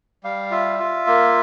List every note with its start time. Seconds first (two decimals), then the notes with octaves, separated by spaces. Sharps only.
0.24 G3 F5
0.51 F4 E5
0.79 F4
1.07 A#3